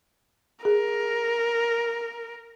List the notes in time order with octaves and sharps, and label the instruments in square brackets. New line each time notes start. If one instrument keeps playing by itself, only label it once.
[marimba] G#4 [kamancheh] A#4